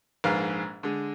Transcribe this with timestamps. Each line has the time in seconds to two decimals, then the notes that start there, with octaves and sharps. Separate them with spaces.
0.24 A#1 G#2 B4 F5
0.83 D3 G#3